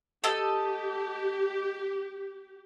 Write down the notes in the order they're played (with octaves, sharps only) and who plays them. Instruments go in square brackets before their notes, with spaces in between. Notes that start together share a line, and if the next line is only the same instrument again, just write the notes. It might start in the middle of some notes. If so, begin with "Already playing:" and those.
[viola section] G4 [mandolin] A4 D#5